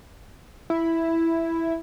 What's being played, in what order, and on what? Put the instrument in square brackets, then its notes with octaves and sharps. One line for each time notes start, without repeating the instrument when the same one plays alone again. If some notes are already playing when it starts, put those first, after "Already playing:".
[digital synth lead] E4